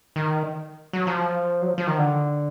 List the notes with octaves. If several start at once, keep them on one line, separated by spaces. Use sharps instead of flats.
D#3
F#3
F3
F#3
F3
F3
D#3
D3